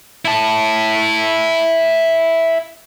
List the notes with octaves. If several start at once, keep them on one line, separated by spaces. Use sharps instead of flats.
E4 A5